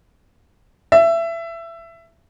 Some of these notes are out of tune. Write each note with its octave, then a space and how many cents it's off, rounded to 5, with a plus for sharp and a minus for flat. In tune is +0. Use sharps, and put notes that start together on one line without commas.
E5 +20